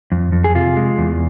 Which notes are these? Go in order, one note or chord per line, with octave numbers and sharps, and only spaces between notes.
F2
F2
G#4
C3 F4
G#3
E2